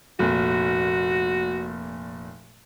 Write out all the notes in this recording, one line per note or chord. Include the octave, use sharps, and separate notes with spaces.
F1 A#2 F#4